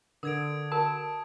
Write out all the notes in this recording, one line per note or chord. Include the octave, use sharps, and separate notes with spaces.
D3 A#4 D#6 G#6 D7
F#4 A#4 A5